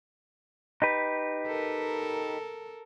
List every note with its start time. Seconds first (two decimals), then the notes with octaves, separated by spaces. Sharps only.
0.82 D#4 G4 B4
1.47 A4 A#4